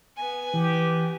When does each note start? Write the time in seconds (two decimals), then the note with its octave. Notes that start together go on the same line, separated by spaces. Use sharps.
0.17 B3 G#5
0.54 E3 G4